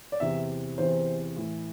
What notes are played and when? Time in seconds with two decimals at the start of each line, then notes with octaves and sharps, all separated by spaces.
0.12 D5
0.20 E2 C3 E3 E5
0.78 E2 C3 E3 C5
1.36 A2 E3